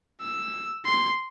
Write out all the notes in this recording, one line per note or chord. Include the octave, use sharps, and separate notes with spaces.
E6
C6